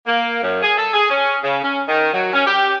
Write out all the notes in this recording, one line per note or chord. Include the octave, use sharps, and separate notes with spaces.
A#3
F#2
G#4
A4
G#4
C#4
C#3
C#4
D#3
F#3
C#4
G4